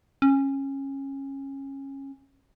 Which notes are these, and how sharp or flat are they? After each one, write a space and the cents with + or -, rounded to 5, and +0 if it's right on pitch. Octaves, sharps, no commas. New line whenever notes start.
C#4 -20